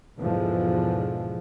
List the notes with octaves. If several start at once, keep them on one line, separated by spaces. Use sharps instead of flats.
E2 G#2 B2 D3 E3 F3